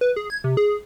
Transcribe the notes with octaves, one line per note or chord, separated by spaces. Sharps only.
B4
G#4
G#6
C3
G#4